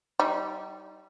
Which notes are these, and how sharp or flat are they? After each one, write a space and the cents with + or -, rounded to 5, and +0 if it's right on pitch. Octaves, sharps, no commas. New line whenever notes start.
G3 -20 D#4 +15